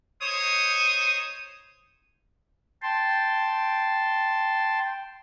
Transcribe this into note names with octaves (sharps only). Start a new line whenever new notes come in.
D#4 C5 C#5 D#6
G5 A5 C6